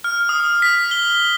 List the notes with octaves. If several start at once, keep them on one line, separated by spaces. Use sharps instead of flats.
F6
D#6
B6
G7